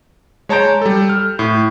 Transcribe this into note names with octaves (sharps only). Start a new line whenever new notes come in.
G#3 C#5 A5 A#5 G6 D7
G3 A4
F6
A2